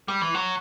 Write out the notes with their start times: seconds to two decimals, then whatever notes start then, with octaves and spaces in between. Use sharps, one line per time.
0.08 G3
0.21 E3
0.34 F#3